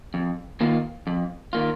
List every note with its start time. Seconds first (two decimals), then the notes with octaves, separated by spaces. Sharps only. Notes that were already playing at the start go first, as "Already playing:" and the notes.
0.14 F2
0.60 D#3 A#3 F4
1.07 F2
1.53 D#3 A#3 F4